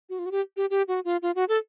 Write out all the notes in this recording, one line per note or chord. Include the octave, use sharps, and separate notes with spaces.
F#4
F4
F#4
G4
G4
G4
F#4
F4
F4
F#4
A4